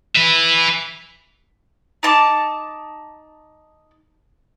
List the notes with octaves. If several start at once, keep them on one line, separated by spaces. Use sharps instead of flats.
B4 E5
D#4 A5 C6 D6